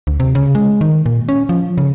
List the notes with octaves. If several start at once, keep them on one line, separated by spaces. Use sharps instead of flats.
D2
C3
C#3
G#3
D#3
A#2
C#4
F3
C#3